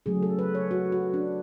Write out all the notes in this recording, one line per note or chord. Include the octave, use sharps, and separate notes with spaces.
C#3 F#3 A3 G#4
A4
B4
C#5
F#4
F#4
D4